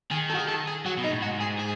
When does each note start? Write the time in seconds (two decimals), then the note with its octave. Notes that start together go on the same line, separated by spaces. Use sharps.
0.11 D#3 G#4
0.30 A4
0.35 F#4
0.38 G#4
0.48 A4
0.67 G#4
0.85 F#3 F#4
0.97 B2
1.04 D#4
1.10 A2
1.22 G#2 F#4
1.41 G#4
1.59 G#4